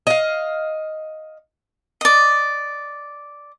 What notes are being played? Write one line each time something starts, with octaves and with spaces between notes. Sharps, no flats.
D#5 F5
D5 D#5